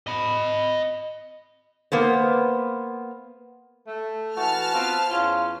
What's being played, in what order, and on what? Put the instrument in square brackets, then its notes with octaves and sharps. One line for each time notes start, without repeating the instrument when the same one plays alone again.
[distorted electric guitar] D#5 B5
[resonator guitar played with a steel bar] A#3 B3 C5
[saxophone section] A3
[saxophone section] E3 F#4 [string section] A5 F6
[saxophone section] B3 C4 F4
E2 C#4 F4